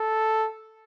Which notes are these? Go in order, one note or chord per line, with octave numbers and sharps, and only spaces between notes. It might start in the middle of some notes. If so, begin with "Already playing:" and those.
Already playing: A4